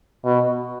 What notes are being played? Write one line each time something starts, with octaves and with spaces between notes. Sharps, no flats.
B2